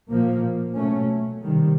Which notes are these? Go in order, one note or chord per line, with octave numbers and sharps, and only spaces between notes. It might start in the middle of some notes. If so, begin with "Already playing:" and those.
A#2 F3 A#3
B2 F#3 A3 C#4
C3 D#3 G3